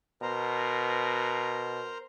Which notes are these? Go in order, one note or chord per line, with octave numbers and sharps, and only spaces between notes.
B2 A#4 C5 A#5